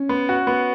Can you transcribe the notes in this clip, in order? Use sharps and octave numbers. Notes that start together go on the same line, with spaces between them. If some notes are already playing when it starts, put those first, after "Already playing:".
Already playing: C#4
B3
F#4
B3